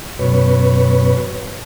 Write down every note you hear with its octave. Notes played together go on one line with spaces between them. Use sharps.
F#2 B2 B4 C#5